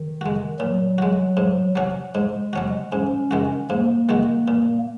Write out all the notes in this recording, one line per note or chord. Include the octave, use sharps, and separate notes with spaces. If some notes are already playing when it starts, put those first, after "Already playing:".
Already playing: D#3
G#3 F#4
A#2 F#3
G#3 F#4
G#2
F#3 C#4 F#4
G#2 G#3
F#3 C#4 F#4
G#2 C#4
D#3 G#3 F#4
G#2 A#3
D#3 G#3 F#4
A#2